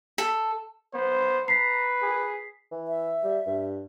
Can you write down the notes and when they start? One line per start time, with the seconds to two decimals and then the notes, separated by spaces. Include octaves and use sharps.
0.18 A4
0.94 B3 C5
1.48 B4 A#5 B6 C7
2.02 G#4
2.71 E3
2.88 E5
3.24 G3
3.46 G2